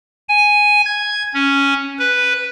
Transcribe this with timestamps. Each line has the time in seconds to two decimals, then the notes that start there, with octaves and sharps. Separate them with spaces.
0.29 G#5
0.85 G#6
1.34 C#4
1.99 B4